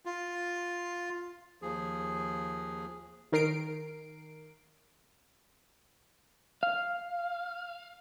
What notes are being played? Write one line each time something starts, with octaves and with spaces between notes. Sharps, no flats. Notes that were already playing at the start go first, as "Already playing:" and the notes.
F4
D#2 F3 G#4
D#3 A#4 C7 D7
F5